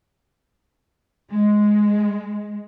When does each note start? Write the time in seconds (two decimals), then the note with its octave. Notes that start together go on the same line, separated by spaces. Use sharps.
1.32 G#3